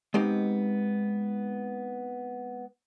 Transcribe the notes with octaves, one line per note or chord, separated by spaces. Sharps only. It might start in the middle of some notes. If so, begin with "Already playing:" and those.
G#3 B3 C4 D#4 G4